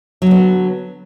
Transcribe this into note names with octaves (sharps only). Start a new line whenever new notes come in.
D3 F#3 B3